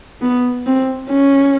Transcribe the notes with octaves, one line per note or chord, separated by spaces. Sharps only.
B3
C4
C#4